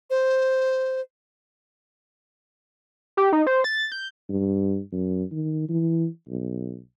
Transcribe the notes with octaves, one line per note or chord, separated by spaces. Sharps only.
C5
G4
D#4
C5
A6
G6
G2
F#2
D#3
E3
B1